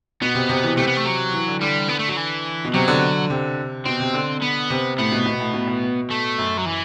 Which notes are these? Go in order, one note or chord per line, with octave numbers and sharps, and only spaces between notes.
B2 B3
C3
C3
E3
C3 A3
B3
A3
F#3
E3
D3
D3 G3
B3
A3
F#3
E3
B2
C3 F#3
D3
C3
B2 C4
C3
D3
B3
C3
A2 B3
B2
B2
A2
B2
B2
A3
F#2
F#3
E3